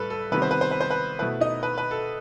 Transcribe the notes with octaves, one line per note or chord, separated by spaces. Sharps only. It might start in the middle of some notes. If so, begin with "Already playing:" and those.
Already playing: A2 G3 A4 B4
A4
C3 D#3 G3 B3 B4
C5
B4
C5
B4
C5
B4
B2 A3 E4 B4
D#4 D#5
B4
B4
A4